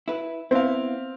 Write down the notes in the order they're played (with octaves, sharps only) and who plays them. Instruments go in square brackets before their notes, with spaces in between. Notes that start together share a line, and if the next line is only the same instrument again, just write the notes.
[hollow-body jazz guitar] E4 B4
[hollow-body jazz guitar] B3 E4 [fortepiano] C4 F5